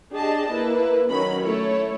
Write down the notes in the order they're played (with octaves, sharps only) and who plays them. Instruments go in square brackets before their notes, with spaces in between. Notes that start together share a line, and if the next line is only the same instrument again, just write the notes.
[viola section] D4 G4 G#4 D#5 A5
A#3 E4 B4
D#3 F#3 C#4 B5
A3 E4 A4 C#5